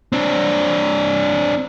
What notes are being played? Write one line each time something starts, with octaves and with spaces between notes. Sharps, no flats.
C4 D4